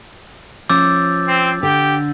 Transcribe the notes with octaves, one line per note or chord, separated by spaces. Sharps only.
F3 C#4 D6 E6 G6 A6
C4
D3 G4